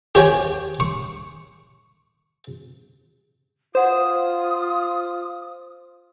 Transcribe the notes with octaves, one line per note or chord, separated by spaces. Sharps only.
G4 C#5 G5 G#5
C#6
F4 F#4 C5 F#5 D#6